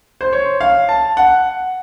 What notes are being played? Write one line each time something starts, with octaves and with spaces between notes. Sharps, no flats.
C5
C#5
F5
A5
F#5